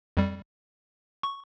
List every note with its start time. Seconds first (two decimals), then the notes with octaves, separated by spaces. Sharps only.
0.17 F2 G3
1.23 C#6